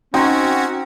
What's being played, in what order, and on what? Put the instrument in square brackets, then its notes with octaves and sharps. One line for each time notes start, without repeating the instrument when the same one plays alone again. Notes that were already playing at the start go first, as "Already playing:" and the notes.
[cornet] C4 [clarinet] C#4 [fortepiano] D#4 G5 C6 [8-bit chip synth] F#4